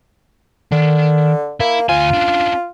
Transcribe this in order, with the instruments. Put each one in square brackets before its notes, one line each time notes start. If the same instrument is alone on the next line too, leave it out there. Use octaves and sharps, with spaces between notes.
[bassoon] D3 [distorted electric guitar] D#3
[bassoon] A#3 [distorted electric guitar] E4
[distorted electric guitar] D2 G#5 [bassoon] F4
[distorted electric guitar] C#4 D4